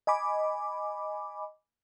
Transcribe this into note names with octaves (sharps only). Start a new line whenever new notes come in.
D#5 G#5 B5 D6